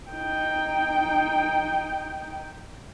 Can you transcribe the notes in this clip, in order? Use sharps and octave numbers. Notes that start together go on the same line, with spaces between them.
D#4 G5